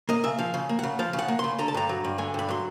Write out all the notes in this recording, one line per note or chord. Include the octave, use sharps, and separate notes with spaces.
A#3 D#5
C#3 E5
F3 F5
C#3
A#3
C#3 F#5
F3 F5
C#3
F#5
A#3
C#3 C6
D3 A#5
A5
G2 A#5
F#3
G2
D3 G#5
G2 B5
F#3 C6